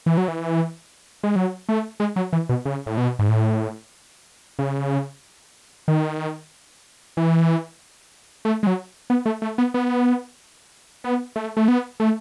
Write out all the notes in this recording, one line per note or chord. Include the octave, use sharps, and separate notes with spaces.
E3
F#3
E3
G#3
F#3
A3
G#3
F#3
E3
B2
C#3
A2
B2
G#2
A2
C#3
D#3
E3
A3
G#3
F#3
B3
A3
A3
B3
B3
B3
A3
A3
B3
A3